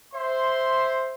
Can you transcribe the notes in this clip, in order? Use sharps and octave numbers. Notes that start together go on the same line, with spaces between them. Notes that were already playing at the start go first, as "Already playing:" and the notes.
C5 E5 C6